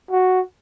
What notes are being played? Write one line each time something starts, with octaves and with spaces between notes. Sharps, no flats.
F#4